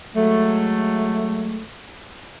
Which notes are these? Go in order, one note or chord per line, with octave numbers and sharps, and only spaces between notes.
F#3 G#3 A3